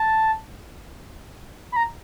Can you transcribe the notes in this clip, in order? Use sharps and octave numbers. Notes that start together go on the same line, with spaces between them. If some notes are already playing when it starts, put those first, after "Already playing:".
Already playing: A5
B5
A#5